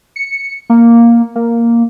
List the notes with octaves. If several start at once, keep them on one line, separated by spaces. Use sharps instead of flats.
C#7
A#3
A#3